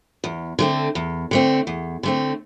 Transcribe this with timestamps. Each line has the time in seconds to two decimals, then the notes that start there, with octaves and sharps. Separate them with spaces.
0.24 E2
0.59 D3 A3 C4
0.95 E2
1.31 D3 A3 C4
1.67 E2
2.03 D3 A3 C4